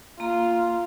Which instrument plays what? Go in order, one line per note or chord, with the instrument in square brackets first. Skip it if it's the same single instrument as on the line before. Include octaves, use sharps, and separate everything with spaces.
[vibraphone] A#3 A#5 [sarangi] F4